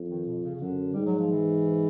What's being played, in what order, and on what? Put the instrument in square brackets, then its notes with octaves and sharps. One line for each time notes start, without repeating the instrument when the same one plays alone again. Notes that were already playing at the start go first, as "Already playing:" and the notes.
Already playing: [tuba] F2
[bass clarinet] D#3
B2
C#3
C#3
[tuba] F#2 [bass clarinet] D3
[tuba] G#2 [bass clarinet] G3
[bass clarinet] F#3
F3
E3